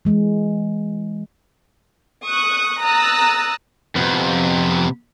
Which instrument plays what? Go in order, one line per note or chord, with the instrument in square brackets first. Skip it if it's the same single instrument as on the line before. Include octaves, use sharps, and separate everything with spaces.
[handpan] E3 G#3
[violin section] C#6 D#6 F#6
A#5 D#6 E6 F#6 A6
[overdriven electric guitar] F2 [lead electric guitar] C3 B3